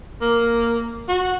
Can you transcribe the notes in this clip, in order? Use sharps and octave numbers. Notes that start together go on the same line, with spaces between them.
A#3
F#4